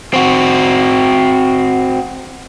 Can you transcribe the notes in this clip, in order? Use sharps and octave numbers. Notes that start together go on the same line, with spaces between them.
C4 F#4